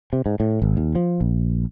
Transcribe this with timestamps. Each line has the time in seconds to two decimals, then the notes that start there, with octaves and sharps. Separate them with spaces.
0.13 C3
0.26 G#2
0.40 A2
0.62 G#1
0.77 D#2
0.95 F3
1.21 A#1